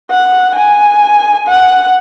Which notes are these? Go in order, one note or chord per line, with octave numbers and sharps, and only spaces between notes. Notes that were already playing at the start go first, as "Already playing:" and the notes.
F#5
G#5
F#5